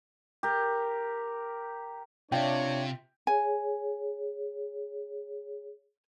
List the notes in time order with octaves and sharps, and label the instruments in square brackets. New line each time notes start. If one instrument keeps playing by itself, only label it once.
[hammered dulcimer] G4 A#4
[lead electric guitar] C3 [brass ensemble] D4 C#5 [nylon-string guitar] F4 E5 [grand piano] G5
[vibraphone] G#4 C#5 [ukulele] G#5